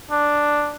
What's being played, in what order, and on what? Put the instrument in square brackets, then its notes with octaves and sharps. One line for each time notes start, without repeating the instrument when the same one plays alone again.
[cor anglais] D4